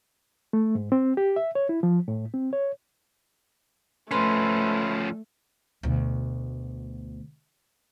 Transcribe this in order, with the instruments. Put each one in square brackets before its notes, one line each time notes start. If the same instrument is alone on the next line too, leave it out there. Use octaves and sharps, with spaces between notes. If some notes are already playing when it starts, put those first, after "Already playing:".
[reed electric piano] A3
G#2
C4
G4
E5
C#5
E4
F3
A2
C4
C#5
[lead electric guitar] F3 C#4 [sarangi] A3 [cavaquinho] B4 C5
[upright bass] D2 B2